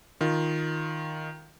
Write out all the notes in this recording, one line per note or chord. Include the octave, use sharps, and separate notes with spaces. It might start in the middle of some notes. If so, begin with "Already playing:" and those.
D#3 F4